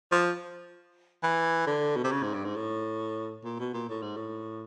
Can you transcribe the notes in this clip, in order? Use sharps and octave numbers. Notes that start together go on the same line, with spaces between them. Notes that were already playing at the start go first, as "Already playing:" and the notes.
F3
E3
D3
B2
C3
C#3
G#2
G2
G#2
A2
A#2
B2
A#2
A2
G#2
A2